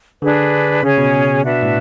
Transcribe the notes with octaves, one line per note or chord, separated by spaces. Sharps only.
D3 D4 G#4 B4
C#3 C#4 G#4 C#5
B2
D4 F#4 B4 E5
A2